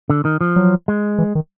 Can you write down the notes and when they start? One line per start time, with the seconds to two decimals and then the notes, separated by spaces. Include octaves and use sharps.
0.10 D3
0.25 D#3
0.41 F3
0.56 F#3
0.88 G#3
1.18 E3
1.35 D#3